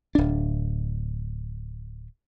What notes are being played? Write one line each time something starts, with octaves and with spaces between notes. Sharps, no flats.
D1 D4